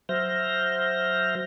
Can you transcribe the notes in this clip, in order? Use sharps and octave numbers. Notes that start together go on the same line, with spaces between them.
F#3 C5 E5 F6 G6 A#6